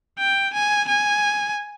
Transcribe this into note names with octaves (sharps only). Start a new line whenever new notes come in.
G5
G#5
G#5